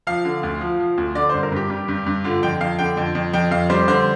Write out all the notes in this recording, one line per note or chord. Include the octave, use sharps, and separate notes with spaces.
F3 F5
D3
D2
F3
F3
D2
D3 D5
G2 C5
A#4
G2 G4
G3
G2
G2
D3 F4
F2 G5
F2 F5
D3 G5
F2
F2
F2 G5
F2 F5
G3 C5
D3 C5